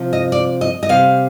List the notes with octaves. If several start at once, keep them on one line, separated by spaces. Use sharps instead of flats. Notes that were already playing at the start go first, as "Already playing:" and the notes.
Already playing: C3 F3
D#5
D5
D#5
D#5
C3 G3 F5